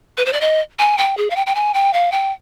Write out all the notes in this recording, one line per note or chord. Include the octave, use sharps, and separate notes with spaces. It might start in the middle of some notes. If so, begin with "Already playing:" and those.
B4
C5
D5
D#5
G#5
G5
G#4
F5
G5
G5
G#5
G5
F5
G5